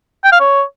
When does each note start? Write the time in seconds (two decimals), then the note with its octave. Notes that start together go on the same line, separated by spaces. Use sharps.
0.24 G5
0.32 F5
0.40 C#5